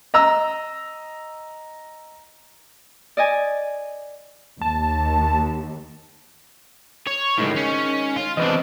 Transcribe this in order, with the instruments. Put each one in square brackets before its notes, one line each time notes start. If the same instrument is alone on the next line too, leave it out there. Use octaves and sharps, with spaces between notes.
[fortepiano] D#5 A#5 E6
[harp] D5 D#5 G#5
[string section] D#2 [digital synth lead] A5
[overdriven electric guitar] C#5
[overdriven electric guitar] C#2 A2 [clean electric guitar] D#3 G#3
[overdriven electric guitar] C#4
F4
[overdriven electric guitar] E2 D4 [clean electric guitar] C4 B4 D#5